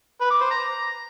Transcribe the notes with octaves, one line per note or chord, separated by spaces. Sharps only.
B4
D6
C5
A#5